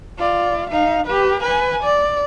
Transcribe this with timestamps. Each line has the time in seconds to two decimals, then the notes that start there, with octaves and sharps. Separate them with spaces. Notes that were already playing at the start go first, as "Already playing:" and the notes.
0.18 F4 D5
0.70 D#4 F5
1.06 G4 B4
1.41 B4 G#5
1.83 D5